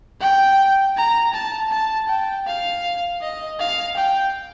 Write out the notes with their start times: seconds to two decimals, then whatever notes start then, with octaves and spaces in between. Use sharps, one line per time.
0.20 G5
0.97 A#5
1.33 A5
1.71 A5
2.08 G5
2.47 F5
3.21 D#5
3.59 F5
3.96 G5